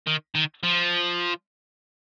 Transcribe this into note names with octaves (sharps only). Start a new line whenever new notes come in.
D#3
D#3
F3